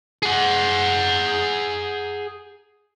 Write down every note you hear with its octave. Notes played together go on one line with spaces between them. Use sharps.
G#4 F#5